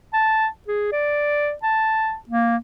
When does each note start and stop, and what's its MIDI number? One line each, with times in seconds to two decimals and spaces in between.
0.13 0.47 81
0.68 0.91 68
0.92 1.53 74
1.63 2.15 81
2.29 2.57 58